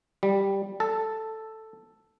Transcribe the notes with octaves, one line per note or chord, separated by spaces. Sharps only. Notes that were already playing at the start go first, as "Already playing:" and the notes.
G3
A4